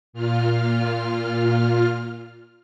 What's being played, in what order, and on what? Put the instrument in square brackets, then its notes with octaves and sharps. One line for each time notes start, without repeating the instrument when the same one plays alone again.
[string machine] A#2 F4 F6